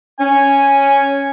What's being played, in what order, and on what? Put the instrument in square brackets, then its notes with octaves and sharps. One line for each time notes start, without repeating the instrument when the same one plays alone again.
[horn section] C#4 [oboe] G#5